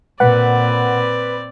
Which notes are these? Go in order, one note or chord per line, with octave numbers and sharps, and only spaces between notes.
A#2 C4 B4 D5 F#5